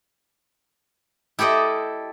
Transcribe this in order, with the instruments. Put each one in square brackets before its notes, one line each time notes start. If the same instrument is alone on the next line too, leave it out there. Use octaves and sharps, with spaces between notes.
[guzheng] E4 G4 A4 D5 D#5